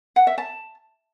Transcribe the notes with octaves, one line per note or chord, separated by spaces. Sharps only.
F#5
E5
A5